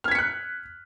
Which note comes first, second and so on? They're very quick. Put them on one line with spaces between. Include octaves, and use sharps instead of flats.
F6 G#6 B6 C#7 F#6